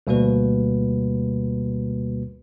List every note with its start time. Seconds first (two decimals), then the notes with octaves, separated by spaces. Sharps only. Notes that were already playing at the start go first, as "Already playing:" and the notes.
0.07 D2 B2 G3 A#3 F#4 B4